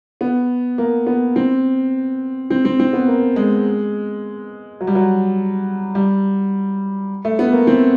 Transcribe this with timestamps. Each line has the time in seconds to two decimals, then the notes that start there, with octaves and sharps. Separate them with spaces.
0.21 B3
0.78 A#3
1.07 B3
1.36 C4
2.50 C4
2.65 C4
2.80 C4
2.93 B3
3.07 A#3
3.36 G#3
4.81 F#3
4.87 G3
4.95 F#3
5.95 G3
7.25 A3
7.39 B3
7.52 A#3
7.67 C4